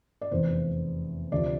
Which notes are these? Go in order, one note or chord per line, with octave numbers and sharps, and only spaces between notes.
D5
F1 E2 E3 C5
D2 C3 F3 D5